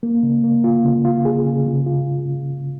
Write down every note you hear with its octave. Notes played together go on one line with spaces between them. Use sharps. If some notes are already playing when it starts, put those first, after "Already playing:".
A#3
C#3
A#3
F4
C#3
F4
G#4
C#3
C#3
F4